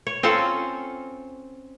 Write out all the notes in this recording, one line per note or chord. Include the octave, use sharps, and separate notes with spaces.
C#5
C4 C#4 F4 A4